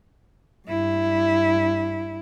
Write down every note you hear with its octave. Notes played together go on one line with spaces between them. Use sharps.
G2 E4